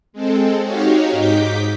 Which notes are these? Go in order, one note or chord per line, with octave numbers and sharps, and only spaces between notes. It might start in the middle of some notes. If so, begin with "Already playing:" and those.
G#3 C4 A4
D#4 F#4 G4 C#5 F5
G#2 D#4 D6 G6 B6